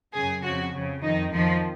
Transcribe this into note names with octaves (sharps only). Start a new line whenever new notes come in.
F#2 C#3 G#4
F2 C#3 F#4
F2 C#3
F2 D#3 D#4
F2 D#3 F3